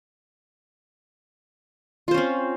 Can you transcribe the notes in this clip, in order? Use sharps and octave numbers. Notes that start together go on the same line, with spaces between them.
C4 C#4 F4 C5